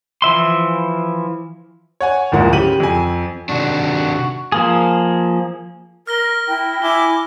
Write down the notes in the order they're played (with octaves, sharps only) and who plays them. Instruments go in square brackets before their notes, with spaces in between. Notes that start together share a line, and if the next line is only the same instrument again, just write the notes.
[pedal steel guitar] E3 F3 E5 C6
[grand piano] C#5 F#5 G#5
D1 D2 G#2 F3 A#3 F#5
C#3 G4 D#7 F#7
F2 G#5
[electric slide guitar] C3 D#3 D4 [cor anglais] F#4
[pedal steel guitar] F3 A#3 G#4
[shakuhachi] A#4 [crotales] F6 A#6 G7
[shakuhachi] E4 [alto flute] G5
[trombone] E4 [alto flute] G#5 [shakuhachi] D6 [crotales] G7